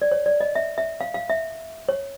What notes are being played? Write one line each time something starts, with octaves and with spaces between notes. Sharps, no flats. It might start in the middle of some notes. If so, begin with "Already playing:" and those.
D5
C#5
D5
D#5
E5
E5
F5
F5
E5
C#5